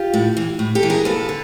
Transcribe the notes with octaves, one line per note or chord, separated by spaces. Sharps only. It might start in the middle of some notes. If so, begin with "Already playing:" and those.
Already playing: F4 G4
A2
E3
A2
G4 A4
E3
G#4 A#4
D#2 A4 B4
D3